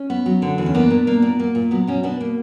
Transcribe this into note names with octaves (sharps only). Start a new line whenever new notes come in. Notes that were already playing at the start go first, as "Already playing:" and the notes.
Already playing: C#4
B3
F#3
D3
E2
C#4
A#3 B3 D4
A#2
A#3
A#2
A#3
A#2
F#3 B3
B2 C#4
B2 B3 D4
A#3